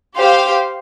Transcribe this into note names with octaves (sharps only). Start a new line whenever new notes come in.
G4 C5 F5